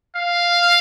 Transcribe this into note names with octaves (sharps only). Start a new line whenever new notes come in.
F5